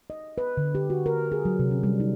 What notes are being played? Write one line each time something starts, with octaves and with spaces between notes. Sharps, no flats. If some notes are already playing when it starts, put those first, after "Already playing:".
D#5
B4
D3
G4
F#4
A#4
G#4
F#3
C3
C#4
G3
D#4